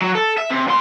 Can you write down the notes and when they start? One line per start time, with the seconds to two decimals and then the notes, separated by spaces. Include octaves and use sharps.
0.02 F#3
0.15 A4
0.38 E5
0.50 C3
0.67 A#2 C6